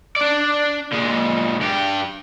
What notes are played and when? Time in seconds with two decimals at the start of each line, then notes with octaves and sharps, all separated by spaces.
0.17 D4 D5
0.93 A#2 G#3
1.61 G2 G4